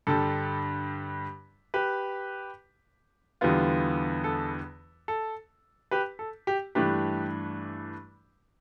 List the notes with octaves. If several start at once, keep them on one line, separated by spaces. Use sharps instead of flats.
G2 D3 G3 A4
G4 B4
E2 D3 G3 B3 F4
A4
A4
G4 B4
A4
G4
G2 E3 A3 D4 G4 B4